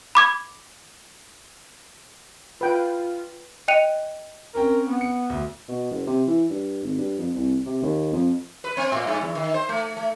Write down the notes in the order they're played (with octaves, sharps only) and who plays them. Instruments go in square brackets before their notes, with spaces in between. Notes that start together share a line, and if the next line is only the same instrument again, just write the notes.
[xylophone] B5 D6 G#6
[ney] F4 [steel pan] B4 G5
[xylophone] D#5 G5 F#6 C#7 D#7 F7
[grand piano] C4 C#4 G5 [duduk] A#4
[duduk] B3
[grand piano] C#7
D2
[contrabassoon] B2
F#1
C3
E3
G2
G#1
G2
F2
C2
C3
D#2
F2
[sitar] B4
C4
A2
G2
E2
D#3
C5
A3
A3